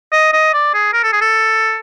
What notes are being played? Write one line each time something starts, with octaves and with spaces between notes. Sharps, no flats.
D#5
D#5
D5
G#4
A#4
A4
G#4
A4